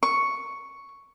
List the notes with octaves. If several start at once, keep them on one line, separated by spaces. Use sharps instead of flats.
C#6